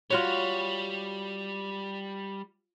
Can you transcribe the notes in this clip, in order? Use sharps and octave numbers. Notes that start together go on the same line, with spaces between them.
G3 F4 F#4 C#5